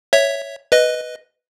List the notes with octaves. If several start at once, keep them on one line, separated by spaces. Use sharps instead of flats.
C#5 E5
B4 D#5